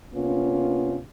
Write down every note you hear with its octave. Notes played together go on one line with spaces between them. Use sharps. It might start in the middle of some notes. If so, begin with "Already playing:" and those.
C3 A#3 B3 C#4 D4 F4